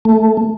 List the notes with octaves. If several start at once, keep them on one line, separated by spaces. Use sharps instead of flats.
A3